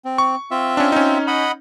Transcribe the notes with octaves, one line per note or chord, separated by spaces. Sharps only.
C4
C#6
C4 F4 E5
C#4 D4
C#4 D#4
D#5 F#5 B5